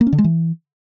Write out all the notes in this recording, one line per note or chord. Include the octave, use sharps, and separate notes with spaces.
A#3
C#4
D3
G#3
E3